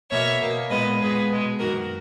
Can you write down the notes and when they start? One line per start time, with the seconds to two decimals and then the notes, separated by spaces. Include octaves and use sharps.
0.11 B2 A#3 C#5 E5
0.41 B2 A#3
0.70 A#2 G#3 B3 B4 D#5
1.00 A#2 G#3 B3 G#4 B4
1.30 B2 G#3 B3
1.59 F#2 D#3 A#3 F#4 A#4